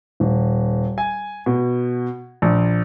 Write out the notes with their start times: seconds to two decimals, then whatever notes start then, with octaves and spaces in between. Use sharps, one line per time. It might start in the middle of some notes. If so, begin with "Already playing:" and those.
0.20 D#1
0.98 G#5
1.46 B2
2.42 A#1